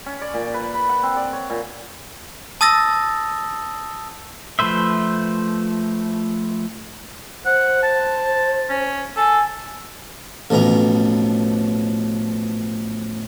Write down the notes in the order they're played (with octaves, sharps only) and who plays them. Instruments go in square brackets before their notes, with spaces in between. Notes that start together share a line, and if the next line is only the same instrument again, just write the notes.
[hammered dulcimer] C#4
D5
A#2
B4
B5
F#5
C4
D5
C#5
A#2
[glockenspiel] A5 D#6 E6 A6 A#6
[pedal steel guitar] F3 A3 B4 C5 E5
[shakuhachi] C5 [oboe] F#5
[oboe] A5
C#4
[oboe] A4 [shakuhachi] G#5
[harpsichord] A1 F2 B2 A#5